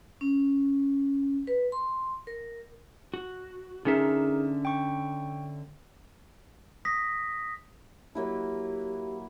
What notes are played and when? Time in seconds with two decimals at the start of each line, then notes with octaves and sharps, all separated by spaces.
0.21 C#4
1.47 B4
1.72 C6
2.27 A#4
3.14 F#4
3.85 D3 C#4 D#4 G#4 A#4 E5
4.65 G5 C#6
6.85 D#6 A#6 B6
8.15 F#3 A#3 E4 G4